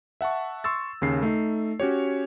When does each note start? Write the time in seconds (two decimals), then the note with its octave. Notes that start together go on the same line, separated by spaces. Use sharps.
0.21 E5 F#5 A5 C#6
0.64 C6 C#6 E6 A6
1.02 D#2 C#3 C7
1.22 A3 D#4
1.80 C#4 F#4 G4 C#5